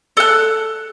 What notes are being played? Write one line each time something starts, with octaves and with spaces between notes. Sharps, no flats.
A4 F#6